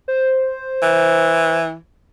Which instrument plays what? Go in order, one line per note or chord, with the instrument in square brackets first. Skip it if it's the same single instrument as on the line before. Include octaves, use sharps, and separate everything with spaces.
[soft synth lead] C5
[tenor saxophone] E3